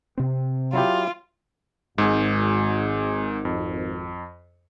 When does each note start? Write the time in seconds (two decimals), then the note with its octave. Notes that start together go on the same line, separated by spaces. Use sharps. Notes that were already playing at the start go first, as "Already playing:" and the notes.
0.18 C3 C4
0.73 F#3 E4 F4 G4
1.98 G#1 G#2 G#4
3.45 F2